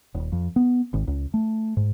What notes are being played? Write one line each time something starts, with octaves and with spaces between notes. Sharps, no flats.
D#1
F2
B3
G#1
C#2
A3
G#2